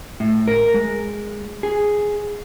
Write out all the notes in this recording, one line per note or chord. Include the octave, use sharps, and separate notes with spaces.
A2
A#4
G#3
G#4